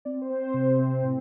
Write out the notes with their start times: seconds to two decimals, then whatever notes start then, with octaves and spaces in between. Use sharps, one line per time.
0.05 C4 D5
0.22 C5
0.30 C4
0.54 C3
0.79 C4
1.03 A2